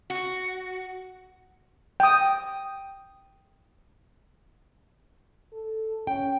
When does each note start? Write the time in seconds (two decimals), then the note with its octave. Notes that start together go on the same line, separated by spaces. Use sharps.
0.10 F#4
2.00 G5 D#6
5.53 A4
6.07 C#4 G5